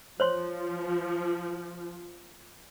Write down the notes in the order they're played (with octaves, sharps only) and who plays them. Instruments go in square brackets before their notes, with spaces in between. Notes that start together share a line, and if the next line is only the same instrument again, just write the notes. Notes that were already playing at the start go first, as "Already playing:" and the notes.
[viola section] F3 [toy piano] C5 C#5 C6